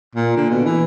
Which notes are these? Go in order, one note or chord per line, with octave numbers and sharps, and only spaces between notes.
A#2
D3
B2
E3